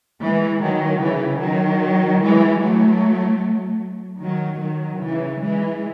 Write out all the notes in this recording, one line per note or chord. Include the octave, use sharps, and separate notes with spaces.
E3 G#3
D#3 F#3
C#3 E3
D#3 F#3
E3 G#3
F#3 A3
D#3 F#3
D#3 F#3
C#3 E3
E3 G#3